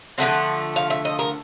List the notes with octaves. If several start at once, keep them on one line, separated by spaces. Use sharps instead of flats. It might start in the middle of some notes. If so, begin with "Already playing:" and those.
D3 F3 A3 C4 F#5
F5
E5
D#5
A#4